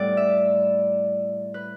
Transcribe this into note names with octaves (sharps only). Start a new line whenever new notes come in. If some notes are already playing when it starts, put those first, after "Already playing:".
Already playing: A2 G3 B3 A4 D5
E5
B4